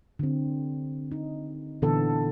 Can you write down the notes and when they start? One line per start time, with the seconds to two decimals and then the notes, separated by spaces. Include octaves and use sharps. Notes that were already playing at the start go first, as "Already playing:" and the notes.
0.19 D3 C4
1.11 D#4
1.82 A#2 D3 E3 B3 A4